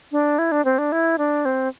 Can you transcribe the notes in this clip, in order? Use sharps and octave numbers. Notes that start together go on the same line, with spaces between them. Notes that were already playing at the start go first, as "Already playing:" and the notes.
D4
E4
D4
C4
D4
E4
D4
C4